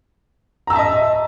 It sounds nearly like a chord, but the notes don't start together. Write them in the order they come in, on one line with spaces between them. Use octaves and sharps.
A#5 E6 A5 E5 D#5